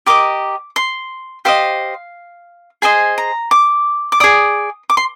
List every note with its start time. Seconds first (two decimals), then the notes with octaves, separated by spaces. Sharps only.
0.06 G4 A#4 D#5 D6
0.76 C6
1.45 G4 C5 D#5 F5
2.82 G#4 C5 D#5 G#5
3.18 A#5
3.51 D6
4.12 D6
4.20 G#4 D5 D#6
4.90 D6
4.97 C6